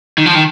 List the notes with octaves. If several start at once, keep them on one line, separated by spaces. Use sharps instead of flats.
D#3
F3
D#3